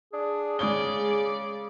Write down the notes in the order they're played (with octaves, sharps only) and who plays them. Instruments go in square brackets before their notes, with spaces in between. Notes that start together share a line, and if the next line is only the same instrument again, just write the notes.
[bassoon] D4 [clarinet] G#4
[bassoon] C#3 [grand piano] G#3 D#6 G7 [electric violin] D5